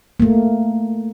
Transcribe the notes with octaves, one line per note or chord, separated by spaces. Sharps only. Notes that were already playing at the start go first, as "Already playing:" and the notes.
A3 A#3